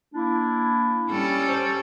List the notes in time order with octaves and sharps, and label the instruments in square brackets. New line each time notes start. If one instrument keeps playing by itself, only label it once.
[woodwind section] A#3 D4 E4
[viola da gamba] G3 C#4 A4
[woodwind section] C5